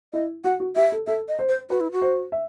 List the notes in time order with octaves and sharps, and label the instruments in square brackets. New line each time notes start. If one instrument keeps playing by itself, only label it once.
[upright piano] E4 [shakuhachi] D#5
[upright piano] F#4 [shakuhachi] F#5
[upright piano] F#4
[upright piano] G4 [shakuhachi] E5
[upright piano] A4
[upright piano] A4 [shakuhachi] E5
[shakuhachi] D#5
[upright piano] C5
[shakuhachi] C5
[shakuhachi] F#4 [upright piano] B4
[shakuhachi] E4
F#4
[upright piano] C5
E5